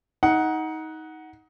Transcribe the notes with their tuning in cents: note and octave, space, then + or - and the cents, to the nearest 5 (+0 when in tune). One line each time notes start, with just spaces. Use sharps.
D#4 +20 F#5 +0